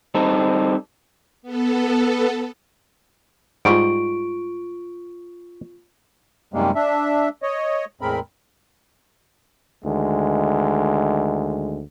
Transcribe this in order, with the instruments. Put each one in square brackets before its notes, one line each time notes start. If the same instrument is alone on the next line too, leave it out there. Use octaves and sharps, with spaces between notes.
[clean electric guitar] G3 C4 D#4 A4
[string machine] B3 A4
[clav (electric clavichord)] G#2 G3 [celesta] F4 C#6 D7
[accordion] F#2 C3 D#3 G3 G#3 A#3
D4 E5
C#5 D#5
E2 A2 G#3 C4 A#4 B5
[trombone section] D2 D#3 G#3